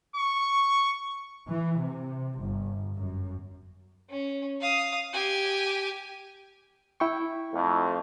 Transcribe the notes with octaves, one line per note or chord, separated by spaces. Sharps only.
C#6
E3
C3
G1
F#2
C#4
F5 D#6
G4 G#5
E4 G5 C#6
F2 A3